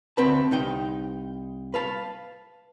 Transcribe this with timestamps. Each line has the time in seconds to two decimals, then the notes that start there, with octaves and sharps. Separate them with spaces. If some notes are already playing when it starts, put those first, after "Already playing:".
0.17 D2 C4 B4 A5
0.51 C2 D#4 G5
1.74 B4 F5 A5